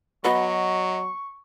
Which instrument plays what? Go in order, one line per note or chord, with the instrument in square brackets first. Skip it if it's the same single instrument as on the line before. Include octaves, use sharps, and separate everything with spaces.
[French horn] F#3 [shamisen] B3 F#4 B4 [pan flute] D#5 [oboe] C#6